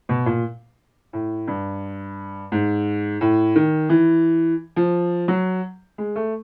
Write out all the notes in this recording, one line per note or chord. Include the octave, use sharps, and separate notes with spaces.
B2
A#2
A2
G2
G#2
A2
D#3
E3
F3
F#3
G#3
A3